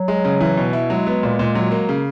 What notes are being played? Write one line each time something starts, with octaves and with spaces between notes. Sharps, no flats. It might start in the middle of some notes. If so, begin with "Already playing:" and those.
Already playing: F#3
G#3
C#3
E3
B2
E4
F#3 G#3
B3
A#2
A#2
F#3
A#3
C#3